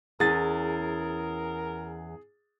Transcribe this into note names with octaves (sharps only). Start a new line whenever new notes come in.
E2 C#4 G#4 A#4 A6